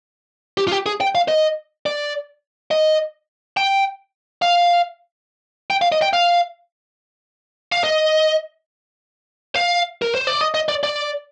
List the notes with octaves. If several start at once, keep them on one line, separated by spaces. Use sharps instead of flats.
G4
F4
G4
G#4
G5
F5
D#5
D5
D#5
G5
F5
G5
F5
D#5
G5
F5
F5
D#5
F5
A#4
C5
D5
D#5
D#5
D5
D5